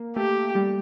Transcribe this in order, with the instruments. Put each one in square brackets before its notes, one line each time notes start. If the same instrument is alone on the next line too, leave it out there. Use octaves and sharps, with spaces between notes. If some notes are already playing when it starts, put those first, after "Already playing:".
Already playing: [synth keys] A#3
[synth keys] A3 [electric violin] G4
[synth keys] G3